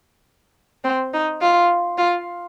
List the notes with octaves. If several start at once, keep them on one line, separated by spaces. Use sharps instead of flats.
C4
D#4
F4
F4